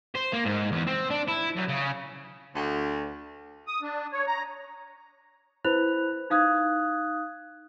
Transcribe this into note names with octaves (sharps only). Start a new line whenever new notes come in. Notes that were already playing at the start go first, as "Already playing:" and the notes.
C5
A#3
G#2
E2
C4
D4
E4
F#2
C#3
D2
D#6
D4
C#5
A#5
E4 B4 C5 B5 F#6 F7
D#4 F5 D#6 F#6 G#6